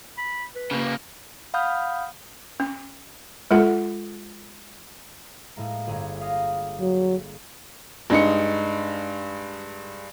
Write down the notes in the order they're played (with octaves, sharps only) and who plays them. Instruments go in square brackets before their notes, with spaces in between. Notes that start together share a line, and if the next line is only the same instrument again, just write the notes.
[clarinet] B5
B4
[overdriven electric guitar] C#3 A#3
[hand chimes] F5 F#5 B5 D#6 F6 G6
[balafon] C#4
G#3 F4 A4 F#5
[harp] A2 G#3 A#3
G1 G#4 A#5
F5 D#6 A#6
[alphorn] F#3
[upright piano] G2 G#3 D#4 C#7